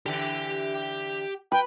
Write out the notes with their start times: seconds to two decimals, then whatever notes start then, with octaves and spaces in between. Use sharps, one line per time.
0.06 D3 E3 G4 G5
1.52 B4 G5